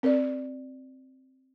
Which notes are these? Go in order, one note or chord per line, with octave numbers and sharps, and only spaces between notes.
C4 A#4 D5